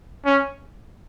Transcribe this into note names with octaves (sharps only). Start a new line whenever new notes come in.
C#4